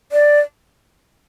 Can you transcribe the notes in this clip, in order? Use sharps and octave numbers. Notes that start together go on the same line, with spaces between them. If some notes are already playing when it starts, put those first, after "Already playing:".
D5